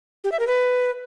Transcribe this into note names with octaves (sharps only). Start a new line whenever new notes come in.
G4
E5
A#4
B4